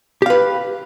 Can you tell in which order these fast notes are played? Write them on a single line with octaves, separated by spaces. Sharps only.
G4 F5 B4